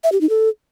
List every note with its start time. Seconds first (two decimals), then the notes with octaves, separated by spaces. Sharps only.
0.04 E5
0.12 G4
0.21 D#4
0.30 A4